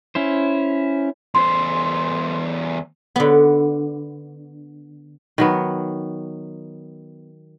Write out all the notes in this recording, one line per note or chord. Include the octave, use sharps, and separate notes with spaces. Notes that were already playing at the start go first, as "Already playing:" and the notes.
C#4 E4 C5
E2 C5 C6
D3 B3
D#3 F#3 B3